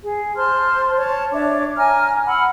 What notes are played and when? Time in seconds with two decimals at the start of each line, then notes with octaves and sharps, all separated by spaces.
0.03 G#4
0.36 C5 A5 C6 F6
0.96 C#5 A5
1.32 D4 C#5 E5 D6
1.76 G#5 A#5 F6
2.26 F#5 B5 E6 F6